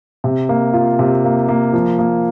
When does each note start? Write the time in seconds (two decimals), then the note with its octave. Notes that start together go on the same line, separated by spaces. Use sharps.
0.24 C3
0.49 A#3
0.74 F4
0.99 C3
1.25 A#3
1.49 A#3
1.73 F3
1.99 A#3